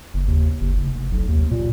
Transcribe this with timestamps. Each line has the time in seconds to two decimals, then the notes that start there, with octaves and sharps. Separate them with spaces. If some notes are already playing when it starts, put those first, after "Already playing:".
0.14 F#1
0.28 D#2
0.61 F#1
0.84 F1
1.12 B1
1.29 D#2
1.51 A#2